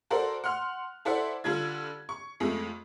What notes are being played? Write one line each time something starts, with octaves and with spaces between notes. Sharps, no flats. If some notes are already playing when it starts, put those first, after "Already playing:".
F#4 A4 A#4 C5 D5
F#5 C6 F6 F#6
E4 A4 C5 D5 E5 F#5
D3 G3 D4 F4 G#6
C#6
F2 G#3 A3